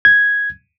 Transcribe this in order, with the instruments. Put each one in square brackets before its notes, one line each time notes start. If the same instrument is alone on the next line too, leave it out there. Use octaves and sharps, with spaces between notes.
[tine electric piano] G#6